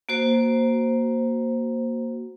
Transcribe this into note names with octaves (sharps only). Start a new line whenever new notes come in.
A#3 F#4 C5